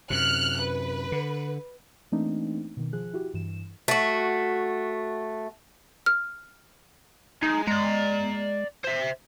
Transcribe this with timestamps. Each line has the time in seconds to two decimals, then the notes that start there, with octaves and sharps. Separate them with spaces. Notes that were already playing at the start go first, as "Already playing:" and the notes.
0.10 F#2 C3 F6 F#6
0.60 B4
1.12 D3
2.12 E3 A3 A#3 C4 D4 D#4
2.77 B2 D#3
2.93 F3 G#4 F#6
3.13 E4 F#4 G4
3.34 G2 E3 E7
3.88 A3 F#4
6.06 F6
7.43 G#3 D#4
7.67 G#3 D5 A#5
8.84 C5 E5